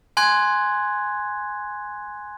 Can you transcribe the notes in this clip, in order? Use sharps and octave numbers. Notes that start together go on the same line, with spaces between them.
G#5 C6 F#6 G#6